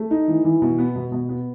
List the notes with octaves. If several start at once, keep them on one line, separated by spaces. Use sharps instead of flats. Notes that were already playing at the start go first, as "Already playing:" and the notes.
Already playing: A3
D#4
E3
E3
B2
B3
B2
B2
B3